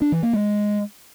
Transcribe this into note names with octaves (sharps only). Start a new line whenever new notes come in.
D4
E3
A#3
G#3